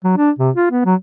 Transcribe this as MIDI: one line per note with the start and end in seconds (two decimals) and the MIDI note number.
0.05 0.14 54
0.18 0.31 62
0.39 0.51 48
0.56 0.68 65
0.71 0.83 59
0.86 0.95 54